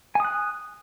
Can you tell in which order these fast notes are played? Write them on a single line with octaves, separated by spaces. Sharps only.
G#5 D#6 F#6